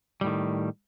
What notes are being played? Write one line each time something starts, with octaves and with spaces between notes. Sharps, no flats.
A2 D#3 G3